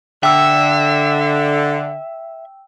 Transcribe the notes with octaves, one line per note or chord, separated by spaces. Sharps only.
D3 E5 G5 E6